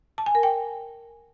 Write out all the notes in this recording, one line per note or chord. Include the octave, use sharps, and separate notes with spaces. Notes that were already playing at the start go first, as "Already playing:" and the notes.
A5
G#5
A#4
G5